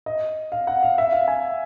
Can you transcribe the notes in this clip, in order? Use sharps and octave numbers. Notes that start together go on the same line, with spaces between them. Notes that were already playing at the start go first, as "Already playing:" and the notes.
D#5
F5
F#5
F5
E5
F5
G#5